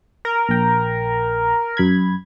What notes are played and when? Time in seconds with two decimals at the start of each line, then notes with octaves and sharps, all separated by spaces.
0.25 A#4
0.49 A#1 G5
1.77 F#2 B5 G#6